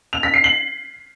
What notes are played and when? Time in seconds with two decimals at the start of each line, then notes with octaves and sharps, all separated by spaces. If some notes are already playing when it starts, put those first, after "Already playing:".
0.13 F7
0.23 B6
0.34 C7
0.44 F#7